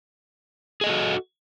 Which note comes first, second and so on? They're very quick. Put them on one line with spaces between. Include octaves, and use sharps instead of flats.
G#4 D#5 A4 F#4